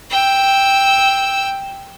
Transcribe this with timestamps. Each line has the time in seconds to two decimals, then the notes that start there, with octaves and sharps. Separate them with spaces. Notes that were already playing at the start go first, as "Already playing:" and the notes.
0.10 G5 E6